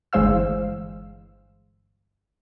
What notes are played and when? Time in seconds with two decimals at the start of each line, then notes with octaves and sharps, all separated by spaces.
0.13 G1 E3 G#3 C5 F5 E6